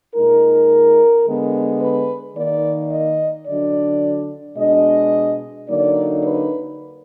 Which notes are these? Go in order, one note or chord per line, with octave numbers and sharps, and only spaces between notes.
A#2 G#3 D#4 A#4
D3 G#3 B3
B4
D#3 A#3 D#4 D5
D#5
D3 F#3 D4 D5
B2 G#3 D4 D#5
D3 F#3 A#3 D#4 D5
B4